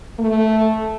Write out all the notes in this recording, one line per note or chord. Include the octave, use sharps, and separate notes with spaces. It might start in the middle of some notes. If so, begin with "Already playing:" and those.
A3